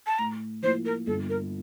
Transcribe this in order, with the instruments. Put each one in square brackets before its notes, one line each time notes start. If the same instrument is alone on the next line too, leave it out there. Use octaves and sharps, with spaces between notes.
[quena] A5
[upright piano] A2 [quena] A#5
[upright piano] F3 A#3 E4 [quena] C5
[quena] A#4
[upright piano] G1 [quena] A4
[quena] A#4